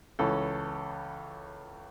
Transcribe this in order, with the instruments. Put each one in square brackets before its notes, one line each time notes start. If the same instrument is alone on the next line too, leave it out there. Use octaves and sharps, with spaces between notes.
[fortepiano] C#2 E3 C#4 A4